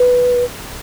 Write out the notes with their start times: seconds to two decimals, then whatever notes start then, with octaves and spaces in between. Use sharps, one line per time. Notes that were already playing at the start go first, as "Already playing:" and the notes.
Already playing: B4